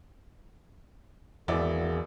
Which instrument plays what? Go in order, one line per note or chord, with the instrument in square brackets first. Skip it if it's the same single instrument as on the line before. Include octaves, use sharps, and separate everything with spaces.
[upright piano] G#1 E4 D5 [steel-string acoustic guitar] E2 [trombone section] A#3 F#4 G#4